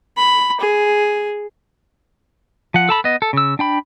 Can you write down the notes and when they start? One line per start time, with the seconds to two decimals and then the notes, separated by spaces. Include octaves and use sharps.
0.17 B5
0.60 G#4
2.74 F3 F#5
2.89 A4 A5 B5
3.04 B3 D#5
3.22 A4
3.33 C#3 E6
3.59 D4 G5 B5